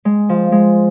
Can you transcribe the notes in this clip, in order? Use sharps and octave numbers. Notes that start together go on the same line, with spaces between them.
G#3
F3
G#3